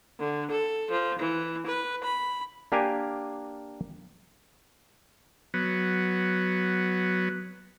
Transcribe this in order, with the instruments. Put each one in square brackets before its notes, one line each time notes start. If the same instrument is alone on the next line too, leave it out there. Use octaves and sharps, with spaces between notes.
[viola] D3
A4
F3
E3
B4
B5
[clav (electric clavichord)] A#3 D4 G4 A#4 F5 G#5
[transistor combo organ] F#3 B3